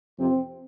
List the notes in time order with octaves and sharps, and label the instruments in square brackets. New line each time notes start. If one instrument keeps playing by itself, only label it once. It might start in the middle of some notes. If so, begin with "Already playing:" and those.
[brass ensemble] F2 C3 F3 C4